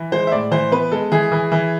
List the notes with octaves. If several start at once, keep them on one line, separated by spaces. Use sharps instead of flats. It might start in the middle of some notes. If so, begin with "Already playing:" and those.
Already playing: E3
G#3 C5
E5
A2 D5
E3 C5
B3 B4
G#3 A4
E3 G#4
E3
E3